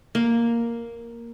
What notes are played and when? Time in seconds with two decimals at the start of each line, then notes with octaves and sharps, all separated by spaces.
0.15 A#3